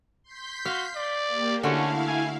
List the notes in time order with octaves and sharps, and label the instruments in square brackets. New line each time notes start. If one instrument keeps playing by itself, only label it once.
[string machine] C6 G6 B6
[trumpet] F#4 [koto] F5
[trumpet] D5
[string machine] A#3 G4
[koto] D3 A3 F#4 [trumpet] C#4 [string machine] E4 F5
[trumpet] G#5